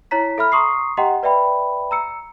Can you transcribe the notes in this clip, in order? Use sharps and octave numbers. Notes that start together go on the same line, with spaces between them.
E4 C#5 A#5 B6
A4 E5 B5 F6
A#5 C6 C#6 D#6 C7
G4 D#5 F#5 G5 A#5 C6
B4 D5 E5 G5 B5
A#5 E6 C#7